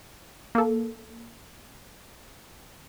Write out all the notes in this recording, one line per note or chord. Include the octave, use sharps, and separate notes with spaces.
A#3 A4